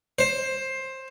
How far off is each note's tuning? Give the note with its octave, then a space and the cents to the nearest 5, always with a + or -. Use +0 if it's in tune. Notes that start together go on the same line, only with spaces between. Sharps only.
C5 +15